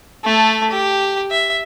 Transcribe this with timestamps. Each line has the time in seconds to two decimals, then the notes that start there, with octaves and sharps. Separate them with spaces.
0.24 A3 A4
0.70 G4
1.31 E5